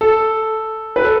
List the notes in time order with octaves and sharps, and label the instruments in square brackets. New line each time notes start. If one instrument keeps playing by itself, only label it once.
[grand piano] A4
B4
A4